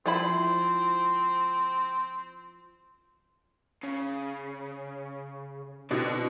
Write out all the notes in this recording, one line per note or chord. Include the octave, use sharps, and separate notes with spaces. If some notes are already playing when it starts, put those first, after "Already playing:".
F3 C4 E4 B5
C#3
B2 D3 C4 E4 D5